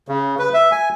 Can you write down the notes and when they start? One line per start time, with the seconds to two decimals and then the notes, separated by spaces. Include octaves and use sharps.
0.08 C#3
0.39 B4
0.54 E5
0.72 G#5